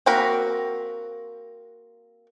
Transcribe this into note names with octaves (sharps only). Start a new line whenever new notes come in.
A#3 C4 F#4 A#4 B5